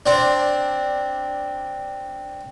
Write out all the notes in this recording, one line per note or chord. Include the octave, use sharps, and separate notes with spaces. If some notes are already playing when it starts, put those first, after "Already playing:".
C4 D4